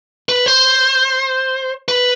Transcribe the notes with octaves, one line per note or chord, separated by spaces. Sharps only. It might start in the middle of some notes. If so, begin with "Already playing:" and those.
B4
C5
B4